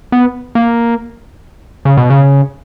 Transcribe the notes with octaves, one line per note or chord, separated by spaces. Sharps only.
B3
A#3
C#3
B2
C#3